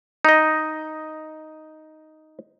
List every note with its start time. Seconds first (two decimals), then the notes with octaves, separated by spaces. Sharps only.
0.25 D#4 D#5